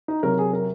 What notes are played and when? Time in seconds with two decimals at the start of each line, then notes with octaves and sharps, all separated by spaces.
0.08 D#4
0.23 C3 F#3 A#4
0.38 G#4
0.53 A#4